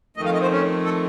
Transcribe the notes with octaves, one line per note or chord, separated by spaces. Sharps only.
F2 D#3 A3 D#5
F5
D#5
C5
C#4
A4